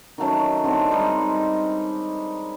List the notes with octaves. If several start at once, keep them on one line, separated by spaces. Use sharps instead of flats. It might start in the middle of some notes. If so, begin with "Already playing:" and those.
D#3 F#3 A3 C#4
D3 D#3 C4
G3 G#3 D#4 A4